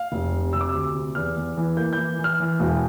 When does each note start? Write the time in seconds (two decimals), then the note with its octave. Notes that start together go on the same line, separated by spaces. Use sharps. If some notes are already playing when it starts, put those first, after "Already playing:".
Already playing: F5
0.12 F1
0.32 C3
0.53 C3 E6
0.61 D6
0.69 E6
0.74 D2
0.95 C3
1.15 E2 F6
1.37 E2
1.57 E3
1.77 A#3 G6
1.93 G6
1.98 E3
2.19 E3
2.24 F6
2.40 E3
2.60 E1